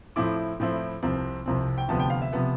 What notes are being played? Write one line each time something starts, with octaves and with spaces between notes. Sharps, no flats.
A2 F3 C4 E4 D6
A2 F3 C4 E4
C2 C3 F3 C4
C2 C3 F3 C4
G5
D2 C3 F3 B3 A5
G5
F5
E5
C3 F3 B3